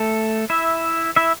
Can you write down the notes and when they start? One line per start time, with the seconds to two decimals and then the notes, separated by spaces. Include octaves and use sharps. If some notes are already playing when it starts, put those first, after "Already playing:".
Already playing: A3 A4
0.50 E4 E5
1.16 E4 E5